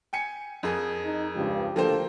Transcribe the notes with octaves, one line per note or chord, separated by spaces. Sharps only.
G5 G#5 C#7
F2 G#4 A#4
D#4
C#2 G2 F3 G4
D2 F3 A#3 A4 C5 G5